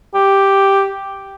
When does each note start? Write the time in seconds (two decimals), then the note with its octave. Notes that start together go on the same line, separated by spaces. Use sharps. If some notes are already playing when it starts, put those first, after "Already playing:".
0.14 G4